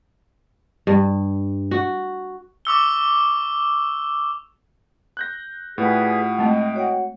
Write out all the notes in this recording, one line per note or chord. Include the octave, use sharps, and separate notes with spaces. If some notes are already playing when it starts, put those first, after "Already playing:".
G2
F#4
C#6 D6 E6 G7
F#6 G6 A#6
A2 F4 G4 G#4 B4 D5 F#5
G#3 A3 C4 D#5 G5
F#4 C#5 F#5